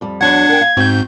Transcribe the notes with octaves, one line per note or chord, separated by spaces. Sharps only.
F2 G3
E2 F#3 D4 F#5 G#6
A#4 G5
F5
G#2 C4 F#4 G6